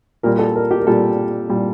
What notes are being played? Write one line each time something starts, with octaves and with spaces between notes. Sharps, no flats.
A#2 G3 A#4
A4
A#4
G4
A#4
A#2 G3 A4
A#2 G3